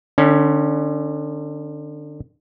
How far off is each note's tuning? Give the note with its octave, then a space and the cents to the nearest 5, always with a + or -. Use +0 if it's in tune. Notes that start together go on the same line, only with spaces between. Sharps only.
D3 +30 C#4 +0